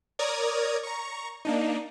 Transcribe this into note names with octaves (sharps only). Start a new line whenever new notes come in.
A#4 C#5 D5 A#5 D#6 G#6
A#5 C#6
A#3 D4 D#4